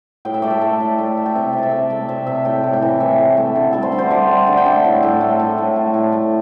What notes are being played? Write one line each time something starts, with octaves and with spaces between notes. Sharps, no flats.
A2 G5
E5
A3 D5
E5
A3
A2
A3
A3
G5
C3 E5
C3
D5 E5
A3
A3 D5
C3 E5
C3 E5
A2 G5
A2
G5
E3
A2 E5
A3
A3
D3
G3 A4
C5
D3
C5
G3 D5
G3
D3
G5
A3 E5
A2
A2
A3
A2
A2
A3
A2
A3